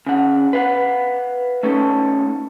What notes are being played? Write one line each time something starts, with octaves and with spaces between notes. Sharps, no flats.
C#3 F#5
B4 F5 F#5
A3 C#4 D#4 A4